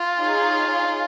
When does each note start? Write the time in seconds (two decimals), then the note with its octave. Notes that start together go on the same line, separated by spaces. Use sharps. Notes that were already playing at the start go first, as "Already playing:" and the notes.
Already playing: F4
0.20 D#4 G#4 C#5 F5